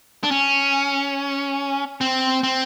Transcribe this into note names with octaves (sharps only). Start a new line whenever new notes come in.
D4
C#4
C4
C4